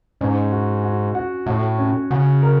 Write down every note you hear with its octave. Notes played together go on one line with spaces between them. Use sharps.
G#2 C#4
F#4
F#4
F#4
A2 F#4
C#4
C#3 F#4
A#4